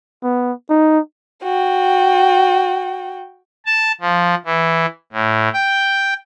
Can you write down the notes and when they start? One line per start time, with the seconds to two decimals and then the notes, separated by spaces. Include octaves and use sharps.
0.23 B3
0.69 D#4
1.44 F#4 G5
3.66 A5
4.01 F3
4.45 E3
5.13 A2
5.53 G5